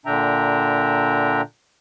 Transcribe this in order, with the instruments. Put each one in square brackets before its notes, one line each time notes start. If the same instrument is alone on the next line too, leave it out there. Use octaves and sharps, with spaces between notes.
[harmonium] A#2 D3 D4 E5 G5 A#5